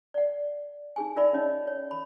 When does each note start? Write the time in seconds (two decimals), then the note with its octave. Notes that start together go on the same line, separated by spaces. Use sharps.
0.14 D5 F#5
0.96 D#4 G#4 G#5
1.16 D#4 F4 A#4 D5 E5 B5
1.33 C#4 D#4 C#5 D#5
1.67 C#5
1.91 B5